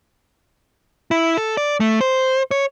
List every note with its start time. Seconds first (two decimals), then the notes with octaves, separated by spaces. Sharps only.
1.11 E4
1.37 A4
1.57 D5
1.80 A3
2.01 C5
2.51 C#5